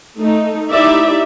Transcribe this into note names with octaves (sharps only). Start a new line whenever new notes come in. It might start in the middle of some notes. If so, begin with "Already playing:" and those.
A3 D#4
D#4 E4 G4 D5 E5